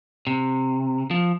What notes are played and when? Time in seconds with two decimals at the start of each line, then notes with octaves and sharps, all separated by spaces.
0.27 C3
1.11 F3